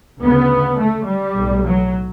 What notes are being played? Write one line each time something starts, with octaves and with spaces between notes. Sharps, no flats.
D2 C#3 B3
A3
G3
B1 A2
F#3